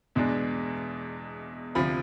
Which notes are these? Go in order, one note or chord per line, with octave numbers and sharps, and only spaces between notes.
E2 B2 G#3 D4
D2 C3 F3 B5